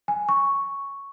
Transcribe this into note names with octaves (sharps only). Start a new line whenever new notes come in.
G#5
C#6